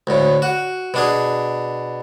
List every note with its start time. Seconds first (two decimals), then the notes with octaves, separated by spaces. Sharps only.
0.07 D2 A2
0.42 F#4
0.94 B2 D4 G#4